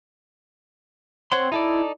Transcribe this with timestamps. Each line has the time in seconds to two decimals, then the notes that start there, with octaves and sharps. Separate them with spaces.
1.32 C4 C#5 F#5 C6
1.52 D#4 E4 A4 D5